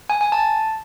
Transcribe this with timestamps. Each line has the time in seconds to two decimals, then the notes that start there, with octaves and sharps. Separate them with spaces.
0.10 G#5
0.21 G#5
0.32 A5